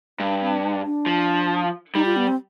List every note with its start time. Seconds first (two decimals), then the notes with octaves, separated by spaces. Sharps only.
0.19 G2 D4
0.41 C4
0.85 D4
1.06 F3
1.95 G3 D#4
2.05 F4
2.16 B3
2.27 C4